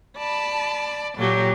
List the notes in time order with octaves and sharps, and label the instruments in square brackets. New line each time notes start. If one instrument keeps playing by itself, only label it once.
[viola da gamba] D5 [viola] A5 B5
[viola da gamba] A#2 F#3 [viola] G4 A4